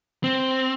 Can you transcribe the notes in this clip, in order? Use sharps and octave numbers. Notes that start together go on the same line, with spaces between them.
C4